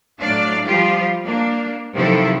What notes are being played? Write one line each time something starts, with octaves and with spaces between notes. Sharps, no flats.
A2 F#3 D4 D5 F5
F3 G3 F4 G4
A#3 D4
C3 D#3 F3 F#3 E4 A4